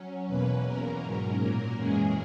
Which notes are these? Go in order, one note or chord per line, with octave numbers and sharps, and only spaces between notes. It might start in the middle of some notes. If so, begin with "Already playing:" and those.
Already playing: F#3 C#4
E2 B2 A#3 C#4 B4
E2 B2 A#3 C#4 A#4
G#2 F#3 C#4
A#2 F#3 A#3 A#4
F#2 E3 G#3 C#4 G#4